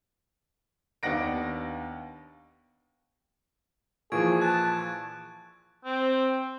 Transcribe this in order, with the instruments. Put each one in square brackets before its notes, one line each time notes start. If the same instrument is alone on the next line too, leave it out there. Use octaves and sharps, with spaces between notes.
[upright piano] D#2 B3 D4 F#5 A#6 D7
[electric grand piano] A#2 E3 F3 [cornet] G#4 [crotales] C#6 G#6 D7
[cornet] A5 [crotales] F#6
[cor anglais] C4